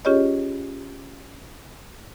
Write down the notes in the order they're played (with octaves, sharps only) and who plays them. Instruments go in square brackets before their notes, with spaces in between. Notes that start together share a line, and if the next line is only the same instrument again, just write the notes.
[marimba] C#4 F4 G4 G#4 C#5 D#5